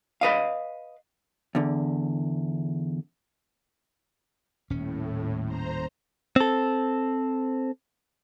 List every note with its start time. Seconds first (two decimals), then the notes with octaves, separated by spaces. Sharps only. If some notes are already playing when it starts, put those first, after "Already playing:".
0.21 B4 D#5 F5
1.55 E2 D3
4.70 D#1 A2 C#4
5.45 C5 A#5
6.36 C4 A4